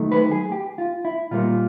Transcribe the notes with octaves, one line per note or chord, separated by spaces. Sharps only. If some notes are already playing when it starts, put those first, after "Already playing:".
Already playing: D#3 F#3 A3
B4
G#4
G4
F4
E4
A#2 G3 A#3 F4